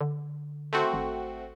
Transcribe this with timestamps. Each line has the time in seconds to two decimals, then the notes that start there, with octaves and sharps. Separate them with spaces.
0.01 D3
0.73 A3 C4 F#4
0.93 G#1